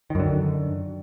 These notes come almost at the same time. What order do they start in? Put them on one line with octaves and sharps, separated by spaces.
D#3 F#2 D3